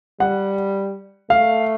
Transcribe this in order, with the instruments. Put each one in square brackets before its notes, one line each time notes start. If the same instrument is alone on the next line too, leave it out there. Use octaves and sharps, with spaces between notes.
[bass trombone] G3 [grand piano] F#5
[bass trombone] A3 [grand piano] F5